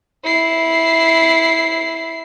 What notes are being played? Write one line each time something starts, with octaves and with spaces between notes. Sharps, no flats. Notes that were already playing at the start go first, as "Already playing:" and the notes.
E4 C7